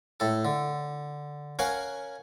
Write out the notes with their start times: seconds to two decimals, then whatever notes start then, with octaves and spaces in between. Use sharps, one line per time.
0.20 A2 A4
0.45 D3
1.59 C#4 A#4 F5 F#5 G#5